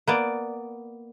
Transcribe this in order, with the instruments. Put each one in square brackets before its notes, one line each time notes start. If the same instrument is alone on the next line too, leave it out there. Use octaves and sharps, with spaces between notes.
[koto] A#3 B3 D5